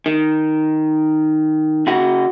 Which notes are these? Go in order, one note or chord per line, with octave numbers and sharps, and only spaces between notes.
D#3
C#3 F#4 F#5